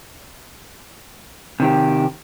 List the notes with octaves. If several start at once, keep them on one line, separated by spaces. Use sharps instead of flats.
C3 D#3 G4